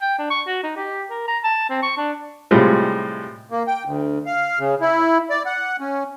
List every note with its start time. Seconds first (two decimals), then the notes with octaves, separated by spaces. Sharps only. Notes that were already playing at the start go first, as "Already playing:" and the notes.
0.02 G5
0.18 D4
0.30 C#6
0.47 F#4
0.63 D#4
0.76 G4
1.10 A#4
1.28 A#5
1.44 A5
1.69 C4
1.83 C#6
1.97 D4
2.51 A2 C3 G3 G#3 F4
3.51 A#3
3.67 G5
3.85 D2
4.26 F5
4.59 C#3
4.81 E4
5.30 D5
5.46 F#5
5.80 C#4